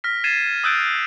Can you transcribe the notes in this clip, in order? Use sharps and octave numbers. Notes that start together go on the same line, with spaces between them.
F6 A#6 B6
G#6 A6 C7 D#7 E7
D#6 E6 F#6 G6 A6 D7